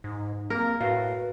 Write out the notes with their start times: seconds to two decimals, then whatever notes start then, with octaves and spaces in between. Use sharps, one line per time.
0.04 G#2 D#4
0.50 A#3 C4 A#4
0.81 A2 F#4 B4 F5